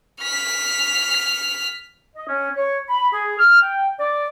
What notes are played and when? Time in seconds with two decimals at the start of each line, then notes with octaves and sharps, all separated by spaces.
0.22 F6 B6
2.16 D#5
2.28 C#4
2.56 C#5
2.89 B5
3.13 G#4
3.38 F6
3.61 G5
3.99 D5